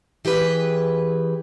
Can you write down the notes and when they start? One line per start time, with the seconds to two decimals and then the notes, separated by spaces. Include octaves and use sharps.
0.25 E3 G4 G#4 B4